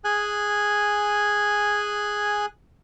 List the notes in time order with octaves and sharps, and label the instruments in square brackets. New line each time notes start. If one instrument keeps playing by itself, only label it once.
[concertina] G#4 G#5 F#6